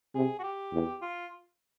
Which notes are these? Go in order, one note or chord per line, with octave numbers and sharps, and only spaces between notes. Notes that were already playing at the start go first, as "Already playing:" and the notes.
C3 G#4
F#4
G4
E2
F4